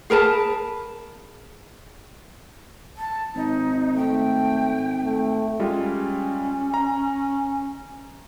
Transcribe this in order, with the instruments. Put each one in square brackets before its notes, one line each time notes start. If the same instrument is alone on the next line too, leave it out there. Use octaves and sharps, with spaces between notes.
[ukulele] G#4 A#4 B4 A5
[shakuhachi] A5
[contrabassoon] G#1 [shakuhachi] D#4
[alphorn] A3 [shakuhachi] G5
[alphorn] A3
[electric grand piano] G3 G#3 F4 [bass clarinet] C#4
[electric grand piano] A#5